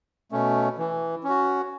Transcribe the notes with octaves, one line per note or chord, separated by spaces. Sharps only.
B2 A3 C#4
E3
C#4
F#4